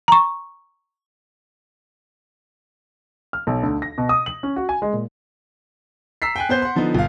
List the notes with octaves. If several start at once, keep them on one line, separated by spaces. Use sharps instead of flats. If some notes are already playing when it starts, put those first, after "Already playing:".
A#5 C#6
F6
B1
D2
A#6
B2
D#6
F#7
C#4
F#4
G#5
G#3
A#2
A#5 E6 B6 C7
G5 G#5 F#6
B3 C5 G6 C7
F#5 C6
D3 F3 B3 D#4
G1 F5